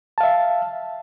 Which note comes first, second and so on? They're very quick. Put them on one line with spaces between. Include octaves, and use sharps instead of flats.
A5 F5 E5